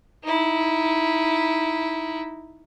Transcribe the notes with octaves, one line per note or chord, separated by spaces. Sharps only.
D#4 E4